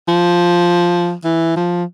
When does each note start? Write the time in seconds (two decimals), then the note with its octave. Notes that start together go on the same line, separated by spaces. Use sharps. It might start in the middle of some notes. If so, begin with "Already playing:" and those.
0.08 F3
1.24 E3
1.56 F3